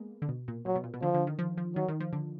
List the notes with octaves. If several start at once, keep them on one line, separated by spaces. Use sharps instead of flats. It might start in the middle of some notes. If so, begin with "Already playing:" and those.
Already playing: G#3 A#3 B3
D3
B2
A#2
A#2 F#3
B2
A#2
B2
D3 F3
D3
D#3
F3
F3
D#3 F#3
D#3
F3
D3